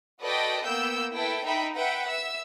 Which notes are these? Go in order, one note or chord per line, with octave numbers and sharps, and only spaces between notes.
F#4 A4 B4 D5 D#5 G5
A#3 B3 G5 E6 G6
E4 A4 B4 G5
D#4 E5 G5 B5
B4 E5 F#5 G5
E5 E6